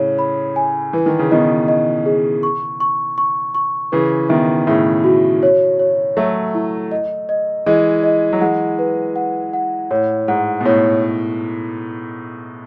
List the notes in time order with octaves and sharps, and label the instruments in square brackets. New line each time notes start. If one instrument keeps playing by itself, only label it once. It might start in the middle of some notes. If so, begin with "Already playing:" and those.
Already playing: [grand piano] A2 C#3 [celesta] C#5
[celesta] B5
G#5
[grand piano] E3 [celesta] B4
[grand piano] D#3
C#3
[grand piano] B2 D#3 [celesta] D#5
[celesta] D#5
G#4
C#6
C#6
C#6
C#6
[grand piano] C#3 E3 [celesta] B4
[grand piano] B2 D#3 [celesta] E5
[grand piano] A2 C#3 [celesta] E5
[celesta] F#4
C#5
C#5
[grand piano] F#3 A3 [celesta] E5
[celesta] E4
D#5
D#5
[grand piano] E3 G#3 [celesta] D#5
[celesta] D#5
[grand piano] F#3
[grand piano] E3 G#3 [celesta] F#5
[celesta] B4
F#5
F#5
[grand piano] A2 [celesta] C#5
[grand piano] G#2 [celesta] F#5
[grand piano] B2
[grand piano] A2 [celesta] C#5